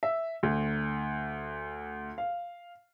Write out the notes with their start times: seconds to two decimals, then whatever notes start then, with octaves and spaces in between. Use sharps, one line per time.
0.03 E5
0.43 D2
2.18 F5